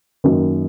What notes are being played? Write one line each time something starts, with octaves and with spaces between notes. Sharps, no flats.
F#2 D#3 A#3